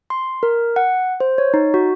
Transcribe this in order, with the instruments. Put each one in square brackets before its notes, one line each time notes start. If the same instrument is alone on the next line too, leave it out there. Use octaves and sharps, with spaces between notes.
[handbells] C6
A#4
F#5
C5
C#5
D#4
F#4